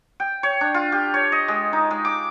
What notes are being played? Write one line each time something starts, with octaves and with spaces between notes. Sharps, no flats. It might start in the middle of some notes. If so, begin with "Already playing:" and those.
G5
C#5
D4
F4
G4
C#5
D#5
G#3
D#4
G#3
D6